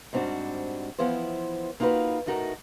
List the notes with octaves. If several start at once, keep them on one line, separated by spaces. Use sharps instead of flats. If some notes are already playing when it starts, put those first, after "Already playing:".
G#2 G3 C4 D4 F#4
E3 F3 B3 E4 C5
A#3 D#4 F4 F#4 B4
A2 A3 D#4 F#4 A#4